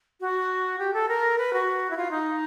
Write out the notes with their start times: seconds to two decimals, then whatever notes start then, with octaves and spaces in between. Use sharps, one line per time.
0.21 F#4
0.79 G4
0.94 A4
1.09 A#4
1.38 B4
1.53 F#4
1.90 E4
1.97 F4
2.11 D#4